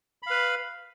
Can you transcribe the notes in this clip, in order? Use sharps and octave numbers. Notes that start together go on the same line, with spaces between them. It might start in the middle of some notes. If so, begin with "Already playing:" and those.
B4 F5 B5